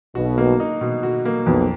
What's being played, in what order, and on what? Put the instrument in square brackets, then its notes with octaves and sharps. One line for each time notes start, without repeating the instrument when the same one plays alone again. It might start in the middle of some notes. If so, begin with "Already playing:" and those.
[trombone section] B1 B2 [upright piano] F#4
[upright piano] A#3
D#4
B2
F#4
A#3
[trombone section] B1 B2 [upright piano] F2